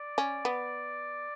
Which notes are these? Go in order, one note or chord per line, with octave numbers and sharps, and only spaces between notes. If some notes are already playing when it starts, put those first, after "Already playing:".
Already playing: D5
C#4
B3